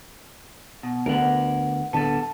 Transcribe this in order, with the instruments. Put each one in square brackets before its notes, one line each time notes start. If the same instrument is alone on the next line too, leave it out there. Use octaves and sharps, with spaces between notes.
[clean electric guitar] B2
[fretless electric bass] D2 D3 B3 [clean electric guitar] A#4 F#5
[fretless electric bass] D1 D3 [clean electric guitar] B3 A4 [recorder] A5